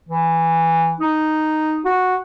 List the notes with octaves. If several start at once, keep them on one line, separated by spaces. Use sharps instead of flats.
E3
D#4
F#4